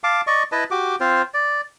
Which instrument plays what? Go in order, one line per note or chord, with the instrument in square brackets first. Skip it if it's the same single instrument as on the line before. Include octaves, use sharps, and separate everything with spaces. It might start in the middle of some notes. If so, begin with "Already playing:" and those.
[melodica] F5 A5 D6
D5 D#5 C#6
E4 B4 D#5 A5
F#4 G4 D6
C4 F4 C5
D5